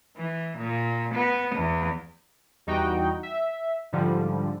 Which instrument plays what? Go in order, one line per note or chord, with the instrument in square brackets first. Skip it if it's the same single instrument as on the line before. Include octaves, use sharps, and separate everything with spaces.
[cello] E3
A#2
B3
E2
[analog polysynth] E2 G3 D#4 F#4 G5
E5
G#2 D3 F3 G3